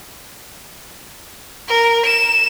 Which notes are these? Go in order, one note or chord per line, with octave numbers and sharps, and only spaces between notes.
A#4
E7